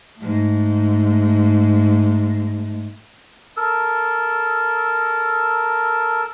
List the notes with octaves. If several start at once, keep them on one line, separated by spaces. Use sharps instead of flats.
G#2 A3
A4 A#4 E6